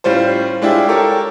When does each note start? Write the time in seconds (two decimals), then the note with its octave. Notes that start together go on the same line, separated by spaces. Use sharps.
0.04 A2 G3 C#4 F4 C5
0.62 G#3 D4 E4 F4 G4
0.89 G4 A4 A#4 C#5